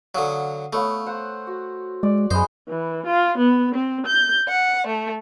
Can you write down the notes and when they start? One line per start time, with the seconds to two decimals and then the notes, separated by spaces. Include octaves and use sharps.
0.15 D3 F#3 F5 D#6
0.73 A3 B3 C#5 F5
1.06 C5 F#5
1.47 F#4
2.03 G#3 D5
2.31 F#2 G#3 B3 C5 D#5
2.68 E3
3.06 F4
3.38 B3
3.75 C4
4.07 G6
4.48 F#5
4.87 A3